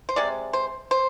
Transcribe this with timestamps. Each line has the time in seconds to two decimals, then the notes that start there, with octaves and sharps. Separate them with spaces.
0.09 C5
0.16 C3 G#3 D5
0.53 C5
0.91 C5